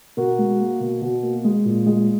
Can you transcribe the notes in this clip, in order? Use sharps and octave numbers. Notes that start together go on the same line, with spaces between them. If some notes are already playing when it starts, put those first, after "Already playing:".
B2 F#4 A#4
G#3
A#3
B2
B2
A#3
G#3
A#2
G#3